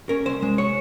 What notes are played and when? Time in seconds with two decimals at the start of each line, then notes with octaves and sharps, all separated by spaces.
0.09 C#4 A#4
0.26 C2 C5
0.42 G#3
0.58 C#5